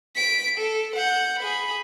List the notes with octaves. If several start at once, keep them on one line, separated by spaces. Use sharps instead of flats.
B6 D7
A4
F#5 G6
G#4 B5